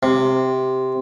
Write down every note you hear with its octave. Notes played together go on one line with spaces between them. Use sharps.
C3